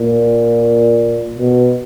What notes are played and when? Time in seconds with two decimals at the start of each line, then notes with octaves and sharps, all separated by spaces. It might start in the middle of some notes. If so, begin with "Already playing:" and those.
Already playing: A#2
1.39 B2